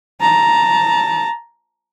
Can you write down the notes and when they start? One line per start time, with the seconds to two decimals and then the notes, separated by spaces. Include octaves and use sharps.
0.21 A5 A#5